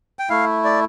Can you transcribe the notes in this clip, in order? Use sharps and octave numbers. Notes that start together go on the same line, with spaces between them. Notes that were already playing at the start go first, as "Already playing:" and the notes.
G5
A3 E4 F5
D5